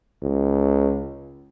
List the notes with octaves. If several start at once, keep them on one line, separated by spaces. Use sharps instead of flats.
C#2